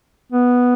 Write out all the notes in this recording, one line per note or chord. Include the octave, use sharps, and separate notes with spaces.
B3